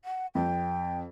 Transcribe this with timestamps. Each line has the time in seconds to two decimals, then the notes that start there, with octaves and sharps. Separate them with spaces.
0.05 F#5
0.35 F2 G5